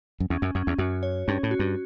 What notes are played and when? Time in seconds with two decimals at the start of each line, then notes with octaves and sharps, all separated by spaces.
0.20 F#2
0.30 E2 C#4
0.42 F#2
0.55 F#2 C#4
0.67 E2
0.78 F#2 F#4
1.03 C#5
1.28 G2 C#4
1.43 A2
1.51 F#4
1.59 G2